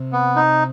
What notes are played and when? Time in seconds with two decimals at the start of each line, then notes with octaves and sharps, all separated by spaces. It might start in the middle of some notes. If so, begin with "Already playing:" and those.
Already playing: C3
0.13 B3
0.36 D#4